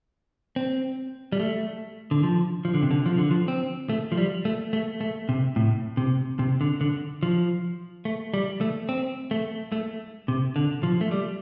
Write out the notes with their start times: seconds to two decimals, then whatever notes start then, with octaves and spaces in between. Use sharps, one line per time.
0.56 C4
1.32 G3
1.40 A3
2.11 D3
2.23 F3
2.65 F3
2.74 D3
2.82 C3
2.91 D3
3.06 F3
3.18 D3
3.31 F3
3.48 C4
3.89 A3
4.12 F3
4.17 G3
4.45 A3
4.73 A3
5.01 A3
5.29 C3
5.56 A2
5.97 C3
6.39 C3
6.61 D3
6.81 D3
7.23 F3
8.05 A3
8.34 G3
8.61 A3
8.89 C4
9.31 A3
9.72 A3
10.28 C3
10.56 D3
10.83 F3
11.01 A3
11.11 G3